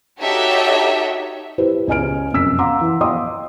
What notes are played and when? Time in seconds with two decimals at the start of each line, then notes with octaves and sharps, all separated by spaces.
0.19 D#4 F#4 G4 A4 C#5 E5
1.58 E4 G4 B4 C5
1.87 C#2 C#4 D#5 G#5 F6 D7
2.33 F1 F#2 E6 B6
2.59 F5 F#5 A#5 C6 D6
2.81 E3
3.01 D#5 F5 G5 C6 D6 D#6